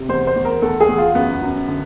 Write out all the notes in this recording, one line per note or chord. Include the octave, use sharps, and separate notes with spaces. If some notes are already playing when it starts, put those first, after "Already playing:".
Already playing: C3
E2 C5
C5
E2
A#4
E2 A4
G#4
E2
F4
F#2 B3
F#2
D3